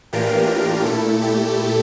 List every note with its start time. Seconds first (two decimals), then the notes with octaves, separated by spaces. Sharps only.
0.13 A2 E3 A#3 D4 F4 G4 A#4
0.49 G4 A#4
0.85 A#2 A3 E4 A4
1.22 G4